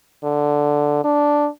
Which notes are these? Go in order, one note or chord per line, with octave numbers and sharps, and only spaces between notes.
D3
D4